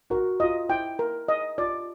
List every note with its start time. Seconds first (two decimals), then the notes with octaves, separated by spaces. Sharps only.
0.10 F#4 A#4
0.40 F4 D#5
0.69 E4 G5
0.99 A#4
1.28 D#5
1.58 F4 D5